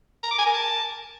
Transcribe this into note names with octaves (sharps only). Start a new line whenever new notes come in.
A#5
D6
G#5
A#4
A5